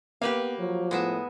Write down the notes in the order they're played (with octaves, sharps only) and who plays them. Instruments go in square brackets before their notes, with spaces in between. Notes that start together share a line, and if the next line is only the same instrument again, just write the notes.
[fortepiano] A#3 [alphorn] B3 [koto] G4 B4 F5
[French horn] F3 [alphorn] F#3
[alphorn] A2 [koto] G#3 B3 E5